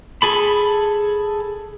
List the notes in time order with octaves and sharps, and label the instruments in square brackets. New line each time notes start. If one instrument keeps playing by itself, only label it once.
[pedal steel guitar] G#4 A4 B5